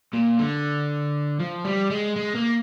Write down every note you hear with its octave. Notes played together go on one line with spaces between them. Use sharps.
A#2
D3
F3
G3
G#3
G#3
A#3